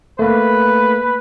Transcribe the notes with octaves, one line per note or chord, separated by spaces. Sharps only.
A3 A#3 B4